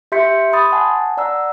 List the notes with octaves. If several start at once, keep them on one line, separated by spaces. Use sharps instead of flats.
G4 E5 C6 G6 B6 C#7
B5 C6 D#6 A6
F#5 G#5 A5
D5 F#5 A#5 E6